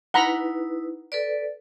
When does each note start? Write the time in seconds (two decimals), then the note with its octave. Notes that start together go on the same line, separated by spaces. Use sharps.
0.14 D#4 E4 B4 F#5 A#5 B5
1.12 A4 B4 D5